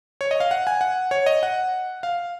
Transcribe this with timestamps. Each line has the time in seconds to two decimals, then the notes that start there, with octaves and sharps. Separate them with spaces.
0.21 C#5
0.31 D#5
0.40 F5
0.51 F#5
0.67 G#5
0.81 F#5
1.11 C#5
1.26 D#5
1.43 F#5
2.03 F5